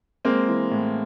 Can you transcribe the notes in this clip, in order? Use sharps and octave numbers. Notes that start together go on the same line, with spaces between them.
G#3 A#3 C4
E3
A2